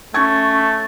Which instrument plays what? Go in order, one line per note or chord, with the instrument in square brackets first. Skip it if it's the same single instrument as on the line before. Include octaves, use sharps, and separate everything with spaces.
[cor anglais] A3 [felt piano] C#4 C#6 G#6